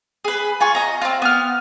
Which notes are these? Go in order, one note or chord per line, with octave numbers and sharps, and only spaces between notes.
G#4 B4
F4 G#5 C#6
D#5 A#5
C4 F4
B3 F6